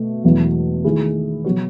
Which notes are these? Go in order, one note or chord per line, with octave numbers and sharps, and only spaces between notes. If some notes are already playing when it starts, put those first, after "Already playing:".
Already playing: B2 A3
E1 E2 B2 F#3 A3
D#3 A3 E4 G#4
B2 F#3 B3 F#4 C#5